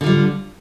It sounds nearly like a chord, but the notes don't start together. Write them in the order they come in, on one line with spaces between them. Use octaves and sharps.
D3 F4 G3